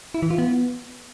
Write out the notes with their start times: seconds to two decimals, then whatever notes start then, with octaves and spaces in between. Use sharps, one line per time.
0.14 E4
0.22 E3
0.30 F4
0.38 B3